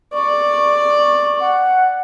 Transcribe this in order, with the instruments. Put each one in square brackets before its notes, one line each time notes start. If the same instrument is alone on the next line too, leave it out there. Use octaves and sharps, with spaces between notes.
[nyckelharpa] D5 [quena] C#6
[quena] F#5